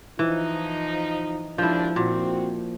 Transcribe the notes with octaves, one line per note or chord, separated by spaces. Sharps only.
E3 F3 D#4
D#2 G#2 F3 D4 E4
A#2 C4 F#4